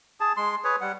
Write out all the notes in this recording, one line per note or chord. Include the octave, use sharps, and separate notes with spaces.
G#4 A5
G#3 C6
G#4 B4 C#5
G3 F#5